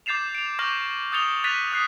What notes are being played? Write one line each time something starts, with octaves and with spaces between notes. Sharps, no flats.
D6 G6 A6 C7 E7 F7
D7 F7
C#6 D6 F6 G6 A#6 F#7
D#6 G6 A6 C#7 F7 G7
F#6 A6 B6 D#7 F7
D#6 F#6 C7